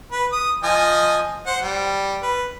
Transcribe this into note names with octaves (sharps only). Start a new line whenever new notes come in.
B4
D#6
F3 D#5 G#5
C5 F#5
G3
B4